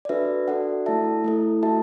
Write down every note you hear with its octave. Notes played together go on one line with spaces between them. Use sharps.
D5
D4 F#4 A4 B4 E5
D4 F#4 A4 D5 F#5
A3 E4 A4 E5 A5
A3 E4 A4
A3 F#4 A4 E5 A5